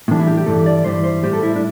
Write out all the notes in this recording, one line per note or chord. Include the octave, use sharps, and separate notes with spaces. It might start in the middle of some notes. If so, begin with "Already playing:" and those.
A2 E3 G3 D4
E4
G4
G4
G2 E3 G3 A4
D5
G2 E3 G3 C5
C5
A2 G3 G4
A4
E4
D4